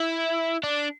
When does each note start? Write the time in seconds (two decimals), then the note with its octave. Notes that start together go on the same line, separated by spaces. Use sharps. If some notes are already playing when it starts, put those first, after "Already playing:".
Already playing: E4
0.63 D4